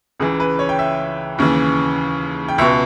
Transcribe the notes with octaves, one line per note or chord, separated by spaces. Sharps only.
C#2 C#3 E3 G#4
B4
C#5
G5
E5
D#2 C#3 E3
G5
C#2 B2 E5